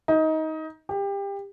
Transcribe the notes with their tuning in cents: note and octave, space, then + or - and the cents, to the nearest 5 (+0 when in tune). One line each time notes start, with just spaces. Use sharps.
D#4 +20
G4 +25